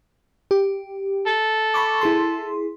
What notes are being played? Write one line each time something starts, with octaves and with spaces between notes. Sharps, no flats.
G4
A4
B5 C#6 D6
E4 G#4 C6